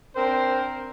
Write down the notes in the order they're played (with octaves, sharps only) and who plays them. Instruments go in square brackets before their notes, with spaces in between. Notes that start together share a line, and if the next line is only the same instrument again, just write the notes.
[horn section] C4 D4 A#4 C5